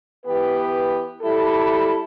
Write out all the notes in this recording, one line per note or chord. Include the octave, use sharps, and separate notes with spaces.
E3 B3 G4 B4
G3 E4 A4